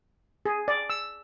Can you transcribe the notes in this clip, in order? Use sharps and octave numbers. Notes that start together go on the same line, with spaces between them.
G#4
D5
E6